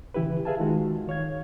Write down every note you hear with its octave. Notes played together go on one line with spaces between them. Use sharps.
C#3 E3 E4 G4 B4
G#4 B4 E5 F5 G#5 A5
D#3 G#3 F4 F#4
D#3 C#5 F5 G#6